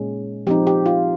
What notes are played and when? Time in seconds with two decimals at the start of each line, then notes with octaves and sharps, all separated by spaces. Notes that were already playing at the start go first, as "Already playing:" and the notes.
Already playing: A#2 G#3 C#4
0.47 F3 C4 D#4 G4
0.67 G4
0.86 F4